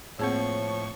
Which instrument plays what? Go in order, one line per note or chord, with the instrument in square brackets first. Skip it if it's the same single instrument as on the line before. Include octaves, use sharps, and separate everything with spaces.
[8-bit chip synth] A2 C#6 [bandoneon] F3 [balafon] A#3 C4 G#4 [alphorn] C#5